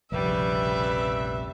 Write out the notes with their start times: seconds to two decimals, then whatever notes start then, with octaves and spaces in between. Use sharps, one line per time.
0.12 F1 A#1 C#3 G3 B4 E5